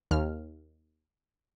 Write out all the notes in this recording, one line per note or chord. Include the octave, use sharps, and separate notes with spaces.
D#2 F6